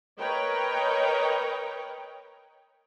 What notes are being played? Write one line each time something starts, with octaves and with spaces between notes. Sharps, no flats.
A#4 B4 C#5 D#5 G5